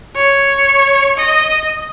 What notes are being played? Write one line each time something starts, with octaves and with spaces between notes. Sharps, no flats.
C#5
D#5